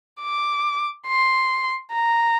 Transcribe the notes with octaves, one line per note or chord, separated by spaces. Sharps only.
D6
C6
A#5